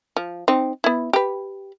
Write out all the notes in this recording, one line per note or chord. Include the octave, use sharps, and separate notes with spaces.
F3
C4 D#4
B3 E4
G4 B4